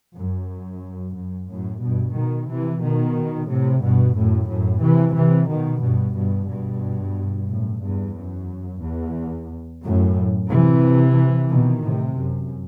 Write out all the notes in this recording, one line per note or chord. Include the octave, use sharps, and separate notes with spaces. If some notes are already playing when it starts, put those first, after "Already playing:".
F#2
F#2
F#2 A2
G2 B2
B2 D#3
C3 E3
B2 D#3
A2 C3
G2 B2
F#2 A2
F#2 A2
C3 E3
C3 E3
B2 D#3
G2 B2
G2 B2
G2 B2
F#2 A2
E2 G2
F#2
E2
F#2 A2
C3 E3
B2 D#3
A2 C3
F#2